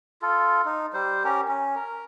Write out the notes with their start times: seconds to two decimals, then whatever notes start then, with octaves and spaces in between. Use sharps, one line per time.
0.22 F4 A4
0.65 D#4
0.93 G3 C5
1.24 C#4 G4 A#4
1.48 C#4
1.76 A#4